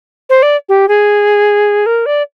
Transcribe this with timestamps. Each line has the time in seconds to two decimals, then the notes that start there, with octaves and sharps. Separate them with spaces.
0.30 C5
0.42 D5
0.69 G4
0.88 G#4
1.86 A#4
2.06 D5